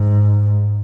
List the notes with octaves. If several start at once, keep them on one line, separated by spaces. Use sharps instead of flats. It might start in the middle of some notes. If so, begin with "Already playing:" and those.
Already playing: G#2